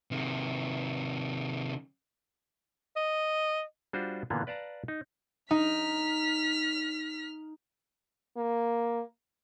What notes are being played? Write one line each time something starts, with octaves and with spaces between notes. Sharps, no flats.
C3 D#3
D#5
G3 D4 F4 F#4 C5
A#2 D3 E3 A#3 B3
B4 D5 F5 A5 A#5
D#4
D#4 F6 B6
A#3